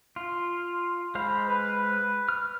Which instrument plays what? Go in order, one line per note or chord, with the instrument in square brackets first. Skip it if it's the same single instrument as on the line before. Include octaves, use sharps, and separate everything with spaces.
[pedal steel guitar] F4
[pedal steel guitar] G#3 C5 F5 [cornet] B5
[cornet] B4
[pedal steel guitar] F6